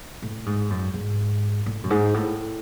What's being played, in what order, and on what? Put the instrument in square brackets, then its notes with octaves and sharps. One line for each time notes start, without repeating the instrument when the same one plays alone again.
[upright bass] A2
G#2
F#2
G#2
A2
F#2
G#2
A2